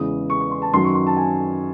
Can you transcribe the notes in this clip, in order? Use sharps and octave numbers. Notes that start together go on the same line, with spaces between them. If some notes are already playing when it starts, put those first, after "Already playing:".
Already playing: E2 C#3 G#3 D#6
C#6
C#6
C6
A5
F#2 D#3 F#3 C6
C#6
C6
A5
G#5